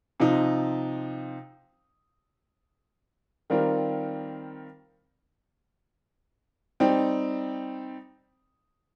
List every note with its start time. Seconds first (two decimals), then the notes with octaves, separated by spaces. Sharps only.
0.20 C3 F3 D#4
3.50 D#3 G3 C4 F4 A#4
6.80 G3 C4 D#4